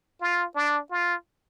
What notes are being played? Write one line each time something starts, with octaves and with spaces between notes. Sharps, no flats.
F4
D4
F4